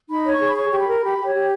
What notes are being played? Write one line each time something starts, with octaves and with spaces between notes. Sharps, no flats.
D#4 B5
C#5
C#6
G#4
B5
C#5 C#6
G4 C#6
B5
A#4
G4 B5
G4
C#5
G4